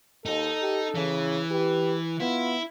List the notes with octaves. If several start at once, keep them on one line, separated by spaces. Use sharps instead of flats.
D#2 D#4 A4
G4
C#3 E3
G4 B4
B3 E4 F4